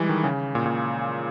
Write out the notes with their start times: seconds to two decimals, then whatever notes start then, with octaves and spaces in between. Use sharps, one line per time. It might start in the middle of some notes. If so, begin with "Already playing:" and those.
Already playing: E3 G3 G#3
0.09 D#3
0.24 C#3
0.55 A#2
0.66 A#2